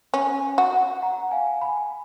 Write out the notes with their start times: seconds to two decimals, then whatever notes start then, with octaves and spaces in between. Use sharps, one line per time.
0.14 C#4
0.58 F#4
1.02 F#5 A#5
1.31 F5 G#5
1.61 G#5 B5